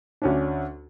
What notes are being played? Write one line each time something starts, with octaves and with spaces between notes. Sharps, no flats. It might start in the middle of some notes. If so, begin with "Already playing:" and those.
D2 C#4 D4